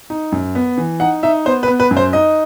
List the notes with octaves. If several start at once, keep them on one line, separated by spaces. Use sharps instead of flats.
D#4
F#2
B3
E3
D#4 F#5
D#4 E5
B3 C5
B4
B3
B4
F#2
C5
D#4 D#5